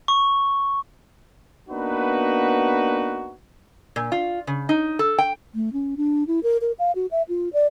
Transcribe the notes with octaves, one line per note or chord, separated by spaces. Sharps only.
C#6
A#3 B3 D4 D#4 F#4 B4
A#2
F4
C#3
D#4
A4
G5
A3
C#4
D4
E4
A#4
A#4
F5
F#4
E5
F4
D5